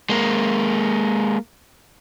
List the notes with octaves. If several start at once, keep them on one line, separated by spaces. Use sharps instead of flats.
G#3 A#3